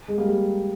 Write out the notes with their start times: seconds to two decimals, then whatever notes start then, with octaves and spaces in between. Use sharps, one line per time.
0.08 G#3
0.18 G3 A#3
0.28 G3